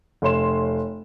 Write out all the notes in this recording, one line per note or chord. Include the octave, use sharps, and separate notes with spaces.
F1 C#5 C6 E7